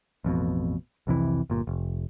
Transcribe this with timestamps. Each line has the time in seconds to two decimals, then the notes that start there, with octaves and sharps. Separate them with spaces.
0.24 A1 F2 B2
1.07 C2 F2 C3 E3
1.50 G1 A#2
1.67 F1